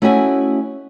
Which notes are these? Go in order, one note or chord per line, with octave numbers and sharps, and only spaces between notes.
A3 C#4 E4 F#4 D#5 G#5